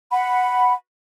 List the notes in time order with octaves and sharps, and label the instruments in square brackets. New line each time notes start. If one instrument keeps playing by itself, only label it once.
[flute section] F#5 B5